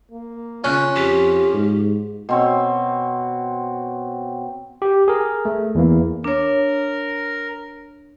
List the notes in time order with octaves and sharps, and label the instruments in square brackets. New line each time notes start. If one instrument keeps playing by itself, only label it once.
[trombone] A#3
[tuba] C#3 [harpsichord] C#4 [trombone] F4 [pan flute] F#6
[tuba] F2 [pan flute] G4
[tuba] G#2
[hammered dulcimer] B2 C4 C#5
[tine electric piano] G4
G#4 A#4
A3
E2 E3 A#3
[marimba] D4 C#5 [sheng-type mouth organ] A#4